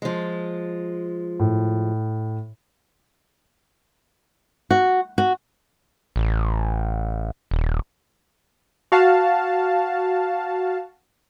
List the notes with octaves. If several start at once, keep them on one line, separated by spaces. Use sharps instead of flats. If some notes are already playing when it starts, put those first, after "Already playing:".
F3 G#3
A2
F#4
F#4
A1
D#1
F#4 F5 A5